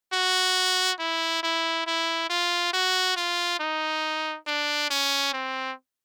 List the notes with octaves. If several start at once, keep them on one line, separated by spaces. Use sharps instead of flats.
F#4
E4
E4
E4
F4
F#4
F4
D#4
D4
C#4
C4